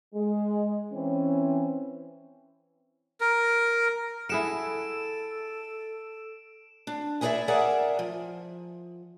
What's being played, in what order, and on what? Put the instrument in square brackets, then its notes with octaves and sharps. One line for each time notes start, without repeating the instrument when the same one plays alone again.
[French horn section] G#3
E3 C4 C#4
[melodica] A#4
[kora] E4 G#4 F#5 [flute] A4 [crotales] D7 E7
[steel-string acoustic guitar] D4
E4 G#4 A#4 C#5 D5 E5
G#4 A#4 D5 E5 F#5
F3